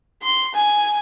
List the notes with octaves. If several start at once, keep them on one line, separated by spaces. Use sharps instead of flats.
C6
G#5